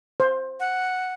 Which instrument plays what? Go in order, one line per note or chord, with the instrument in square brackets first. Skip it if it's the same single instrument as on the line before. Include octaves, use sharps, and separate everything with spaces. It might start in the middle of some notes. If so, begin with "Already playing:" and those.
[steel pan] C5
[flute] F#5